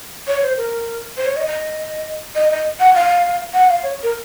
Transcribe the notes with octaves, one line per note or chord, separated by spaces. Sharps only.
C#5
C5
A#4
C5
C#5
D#5
D#5
D#5
D#5
F#5
F5
F#5
F5
C#5
A#4